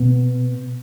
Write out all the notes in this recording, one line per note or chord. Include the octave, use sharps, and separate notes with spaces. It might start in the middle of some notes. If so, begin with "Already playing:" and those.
Already playing: B2 B3